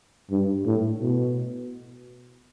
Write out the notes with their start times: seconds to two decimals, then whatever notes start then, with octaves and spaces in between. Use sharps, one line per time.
0.31 G2
0.65 A2
1.01 B2